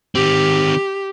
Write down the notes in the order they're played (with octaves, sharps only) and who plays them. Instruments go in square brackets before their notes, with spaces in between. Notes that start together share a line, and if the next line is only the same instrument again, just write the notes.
[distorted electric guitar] D#3 C4 [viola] G4